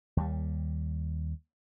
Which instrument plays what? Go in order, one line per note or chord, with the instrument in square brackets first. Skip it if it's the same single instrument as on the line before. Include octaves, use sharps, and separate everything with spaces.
[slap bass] D#2 G3